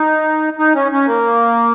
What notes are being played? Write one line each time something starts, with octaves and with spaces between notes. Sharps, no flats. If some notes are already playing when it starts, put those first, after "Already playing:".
Already playing: D#4
D#4
C#4
C#4
A#3